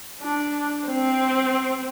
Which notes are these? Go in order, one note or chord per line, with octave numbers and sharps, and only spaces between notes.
D4
C4